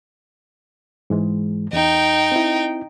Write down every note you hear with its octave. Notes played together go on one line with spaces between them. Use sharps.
G#2 E3 G#3
E2 D#4 G5
C4 E4